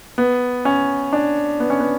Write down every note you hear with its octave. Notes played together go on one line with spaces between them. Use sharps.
B3
C#4
D4
B3
C#4
B3